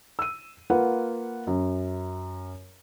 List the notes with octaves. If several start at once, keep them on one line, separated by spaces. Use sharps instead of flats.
E6 D#7
A#3 F4 B4 F#5
F#2